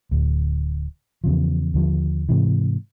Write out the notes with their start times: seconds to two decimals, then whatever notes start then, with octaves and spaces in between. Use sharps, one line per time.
0.11 D1 D2
1.24 E2 C#3 F3
1.74 D#2 D3 F3
2.29 G#2 C3 E3